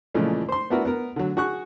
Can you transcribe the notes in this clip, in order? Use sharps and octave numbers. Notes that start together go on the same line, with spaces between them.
A#2 C#3 E3 F3 G#3 A3
C5 C6
B3 D4 E4 F#4 A#4 B4
B3 A#4
D3 F#3
F#4 G#4 C#6 F#6